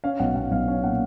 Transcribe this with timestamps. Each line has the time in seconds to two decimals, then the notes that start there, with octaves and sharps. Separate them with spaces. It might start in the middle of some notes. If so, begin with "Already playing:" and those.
0.04 C#4 F5
0.19 B1 F#5
0.36 B1 F#5
0.51 B1 F5
0.68 C#4
0.84 A#2 F#5